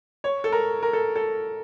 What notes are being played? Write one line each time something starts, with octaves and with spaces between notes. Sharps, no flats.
C#5
A4
A#4
A#4
A4
A4